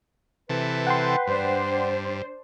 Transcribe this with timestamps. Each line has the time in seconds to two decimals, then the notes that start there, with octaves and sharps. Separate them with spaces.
0.50 C3 E3 A4 B4
0.87 F#5 G5 C6
1.27 G2 D4 C5